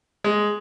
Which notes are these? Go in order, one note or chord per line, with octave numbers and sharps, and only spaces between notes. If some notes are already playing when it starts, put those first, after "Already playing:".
G#3